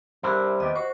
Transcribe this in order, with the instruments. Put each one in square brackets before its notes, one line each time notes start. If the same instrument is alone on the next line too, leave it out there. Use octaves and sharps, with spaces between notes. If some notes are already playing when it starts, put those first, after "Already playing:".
[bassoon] C3 [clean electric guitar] G3 D4 E4 [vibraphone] G4 A#4
[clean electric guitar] D#2 B3 G4 [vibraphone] D#5
[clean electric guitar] F#4 [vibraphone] C5